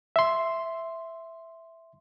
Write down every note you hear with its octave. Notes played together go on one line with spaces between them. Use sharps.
E5 C6